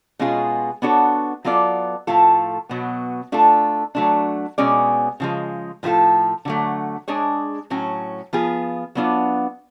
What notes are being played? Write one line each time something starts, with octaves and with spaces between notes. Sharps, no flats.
B2 G#3 C#4 F4 G#4
B3 D4 F#4 A4 C#5
F#3 B3 F4 A4 D5
A2 F3 A3 F4 A4
B2 F#3 B3
A3 D4 F4 A4
F#3 A3 D4
B2 G#3 C#4 G#4 D5
C#3 F3 G#3
A2 F3 B3 F4 A4
D3 F#3 A3
G#3 D4 G#4 C#5
A2 F#3 C#4
F3 B3 F4 G#4
F#3 B3 D4 F4